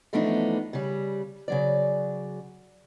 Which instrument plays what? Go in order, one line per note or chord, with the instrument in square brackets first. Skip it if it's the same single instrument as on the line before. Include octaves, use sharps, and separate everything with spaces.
[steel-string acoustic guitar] E3 F3 A3 B3 D4 D#4
C#3 G3
C#3 F#3 D5